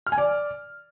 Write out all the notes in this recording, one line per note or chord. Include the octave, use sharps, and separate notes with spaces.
F6
G#5
D5